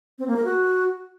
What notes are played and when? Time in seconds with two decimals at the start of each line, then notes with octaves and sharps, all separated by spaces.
0.19 C4
0.27 A#3
0.36 A#4
0.45 F#4